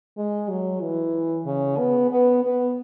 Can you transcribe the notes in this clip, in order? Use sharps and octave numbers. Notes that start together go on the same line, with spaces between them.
G#3
F#3
E3
C#3
B3
B3
B3